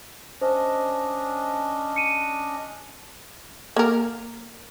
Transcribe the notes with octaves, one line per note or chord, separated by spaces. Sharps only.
C#4 D4 C5 D#5
C#7 D#7
A#3 A#4